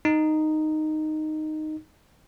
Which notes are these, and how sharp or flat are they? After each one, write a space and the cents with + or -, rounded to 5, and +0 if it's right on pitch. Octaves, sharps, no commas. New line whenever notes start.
D#4 -5